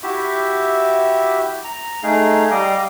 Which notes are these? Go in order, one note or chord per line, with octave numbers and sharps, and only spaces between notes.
E4 F#4 G4 E5
A#5
A3 D#4 G#4 F5
G3 D#5 F5 D6